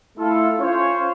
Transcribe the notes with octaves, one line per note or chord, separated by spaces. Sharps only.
A3 E4 F4 A4
C#4 F4 C5 C#5